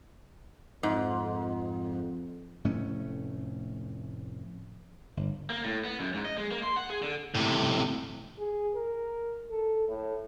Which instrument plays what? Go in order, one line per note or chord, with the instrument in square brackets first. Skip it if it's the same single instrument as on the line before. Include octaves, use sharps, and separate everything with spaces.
[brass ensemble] F2 [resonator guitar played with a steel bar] G#2
[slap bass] F1 A2 A3 C#4
G1
[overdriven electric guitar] A#3
A2
B3
F#2
G#2
D#5
G#3
A#3
C6
F#5
G#4
D3
[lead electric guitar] A2 C3
[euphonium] G#4
A#4
A4
A2